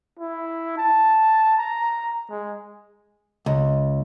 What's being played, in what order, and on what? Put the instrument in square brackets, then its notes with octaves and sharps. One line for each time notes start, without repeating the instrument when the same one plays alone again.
[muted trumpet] E4
A5
A#5
G#3
[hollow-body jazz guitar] C#2